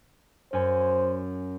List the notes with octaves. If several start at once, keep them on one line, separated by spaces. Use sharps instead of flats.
F#2 C#4 C5 G#5